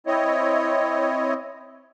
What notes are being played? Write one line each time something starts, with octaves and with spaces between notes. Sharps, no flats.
C4 E4 C#5 D#5